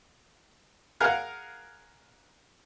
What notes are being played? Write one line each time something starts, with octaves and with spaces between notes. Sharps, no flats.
G#4 A#4 F5 F#5